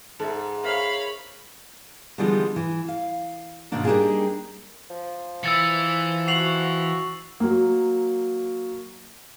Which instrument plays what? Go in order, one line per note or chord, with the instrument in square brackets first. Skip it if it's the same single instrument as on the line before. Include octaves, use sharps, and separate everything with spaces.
[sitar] G#2 [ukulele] A4 E5
[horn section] A#4 C#5 F5 [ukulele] C5 E5 [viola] B5
[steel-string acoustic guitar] D3 E3 F3 G3 G#3 B3
E3
F5
G#2 B2 D#3 A#3 D4
G3 A#3 D4 D#4 G4 G#4
[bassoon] F3
[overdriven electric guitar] E3 [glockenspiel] E6 A6 C#7
[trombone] F#4 [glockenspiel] C7 F7 F#7
[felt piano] F#3 A#3